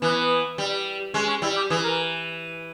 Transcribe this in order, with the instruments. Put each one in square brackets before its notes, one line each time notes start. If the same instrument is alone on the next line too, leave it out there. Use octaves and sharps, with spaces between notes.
[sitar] E3 [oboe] B3
[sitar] G3
[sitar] G#3 [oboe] C#4
[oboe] C#4
[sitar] G3 [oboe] E4
[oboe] G4
[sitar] E3 [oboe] G#4
[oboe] A#4